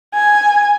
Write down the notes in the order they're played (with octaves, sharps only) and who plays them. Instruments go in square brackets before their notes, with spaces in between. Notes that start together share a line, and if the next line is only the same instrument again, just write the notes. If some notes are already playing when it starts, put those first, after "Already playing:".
[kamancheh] G#5